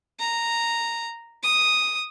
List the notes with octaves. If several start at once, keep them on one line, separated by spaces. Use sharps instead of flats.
A#5
D#6